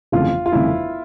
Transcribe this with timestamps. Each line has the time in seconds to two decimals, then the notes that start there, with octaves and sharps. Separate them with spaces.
0.12 G1 F2 C#3 E3 A3 F4
0.46 F4
0.52 G1 F2 C#3 E3 A3 E4